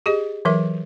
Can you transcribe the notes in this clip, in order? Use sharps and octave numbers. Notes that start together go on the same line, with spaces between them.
G4 G#4 D#5
E3 F#3 A#4 E5